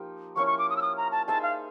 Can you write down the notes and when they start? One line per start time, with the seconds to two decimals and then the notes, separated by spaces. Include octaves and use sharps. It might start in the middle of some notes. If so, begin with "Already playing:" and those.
Already playing: F3 A#3 D#4 G4
0.36 F3 A#3 C#4 E4 C#6
0.47 C#6
0.58 D6
0.70 D#6
0.76 E6
0.82 D#6
0.97 A#5
1.11 A5
1.28 D#4 G#4 C5 E5 A5
1.42 F5